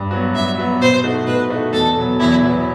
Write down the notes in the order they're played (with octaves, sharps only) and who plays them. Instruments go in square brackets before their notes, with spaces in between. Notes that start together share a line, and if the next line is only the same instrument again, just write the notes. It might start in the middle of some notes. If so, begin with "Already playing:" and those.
Already playing: [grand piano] G2
F#3 B3 F#4
[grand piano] G2 [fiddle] E5
[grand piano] F#3 B3 F#4
[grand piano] B2 [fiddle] C5
[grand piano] A3 D#4 F#4
[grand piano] B2 [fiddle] B4
[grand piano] A3 D#4 F#4
[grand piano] E2 [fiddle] A4
[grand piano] B2 F#3 B3
[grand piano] E2 [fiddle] E4
[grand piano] B2 F#3 B3